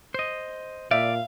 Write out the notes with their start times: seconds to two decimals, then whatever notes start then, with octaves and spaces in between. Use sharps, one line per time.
0.14 C5 D#5
0.91 A#2 D5 E5 F5